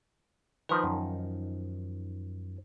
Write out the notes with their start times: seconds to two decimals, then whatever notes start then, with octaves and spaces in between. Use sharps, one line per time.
0.69 D#3 F3 D#4 B4 C5 B5
0.84 F#2